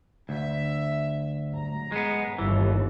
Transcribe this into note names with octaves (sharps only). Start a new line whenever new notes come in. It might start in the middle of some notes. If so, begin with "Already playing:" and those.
D2 E5
A#5
G#3 B3
G1 D#2 E3